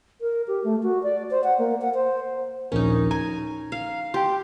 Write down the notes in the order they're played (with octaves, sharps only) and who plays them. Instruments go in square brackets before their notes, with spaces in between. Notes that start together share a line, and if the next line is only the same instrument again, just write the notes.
[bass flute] A#4
G4
A3
F#4
D5
C5
F#5
A#3
F#5
C5
[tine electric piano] A#1 D#2 A#4 [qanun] C#4 D#4
[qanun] G#5 [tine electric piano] A#5
[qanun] F5
[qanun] G4 [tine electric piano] G5 C6